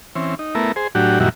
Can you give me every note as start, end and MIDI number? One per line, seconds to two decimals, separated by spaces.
0.16 0.35 52
0.16 0.35 60
0.16 0.35 61
0.39 0.55 63
0.55 0.72 57
0.55 0.72 59
0.55 0.72 64
0.55 0.72 70
0.76 0.87 68
0.76 0.87 72
0.95 1.19 45
0.95 1.19 54
0.95 1.19 62
0.95 1.19 66
0.95 1.19 67
1.20 1.29 42
1.20 1.29 46
1.20 1.29 51
1.20 1.29 55
1.20 1.29 64
1.20 1.29 66